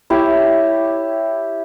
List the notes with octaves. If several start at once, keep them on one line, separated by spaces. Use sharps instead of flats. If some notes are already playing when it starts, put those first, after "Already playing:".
E4 G4 C#5 E5